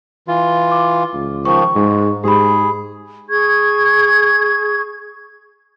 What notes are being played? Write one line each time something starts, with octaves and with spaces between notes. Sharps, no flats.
E3 F4
D6
C#2
D#3 F3 C#6
G#2 G#3
G#2 G4 G#4 B5
G#4 C#6 G#6